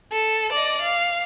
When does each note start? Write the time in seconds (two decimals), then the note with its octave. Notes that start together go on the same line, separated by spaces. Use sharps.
0.12 A4
0.52 D5 D#5
0.81 F5